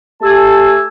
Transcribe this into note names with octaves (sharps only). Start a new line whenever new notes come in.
A3 G4 G#5 A5 E6